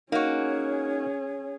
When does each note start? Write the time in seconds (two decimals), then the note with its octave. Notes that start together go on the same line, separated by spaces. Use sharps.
0.12 A#3 C#4 D#4 F#4 G#4 C#5